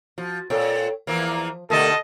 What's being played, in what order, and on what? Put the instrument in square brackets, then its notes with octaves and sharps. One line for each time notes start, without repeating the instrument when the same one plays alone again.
[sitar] F3 [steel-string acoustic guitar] F#4
[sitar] A#2 C4 [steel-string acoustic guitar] A4 C#5 G5
[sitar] E2 E3 A#3 [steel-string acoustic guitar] F3
[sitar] B2 D3 G4 [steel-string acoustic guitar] A3 A#4 [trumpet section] A4 D#5 A5